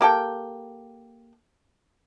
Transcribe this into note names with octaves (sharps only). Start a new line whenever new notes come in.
A#3 G4 A4 G5